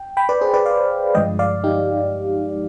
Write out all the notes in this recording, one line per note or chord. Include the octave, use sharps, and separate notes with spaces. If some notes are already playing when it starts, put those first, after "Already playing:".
Already playing: G5
G5 B5
B4 D5
G#4 C5
B4 D5
D5 F5
G2 D3 F3 G#3 D#5 G5
D5 F5
D#4 G4